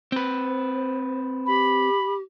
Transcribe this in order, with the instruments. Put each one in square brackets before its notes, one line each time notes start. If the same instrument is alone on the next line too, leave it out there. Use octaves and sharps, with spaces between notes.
[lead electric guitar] C4 B4 [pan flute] C5
[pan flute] G4 [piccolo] B5